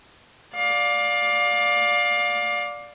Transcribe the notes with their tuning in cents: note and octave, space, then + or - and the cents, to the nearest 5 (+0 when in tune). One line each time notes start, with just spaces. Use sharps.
D5 +0 F5 +25